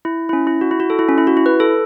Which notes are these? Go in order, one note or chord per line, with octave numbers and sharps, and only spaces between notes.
E4
E4
C#4
E4
F#4
E4
F#4
A4
E4
C#4
E4
F#4
E4
B4
A4